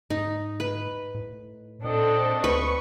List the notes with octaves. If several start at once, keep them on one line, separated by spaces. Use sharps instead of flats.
G#2 D#4
B4
A2
A#2 C4 D4 A4 D#5
D2 B4 C#6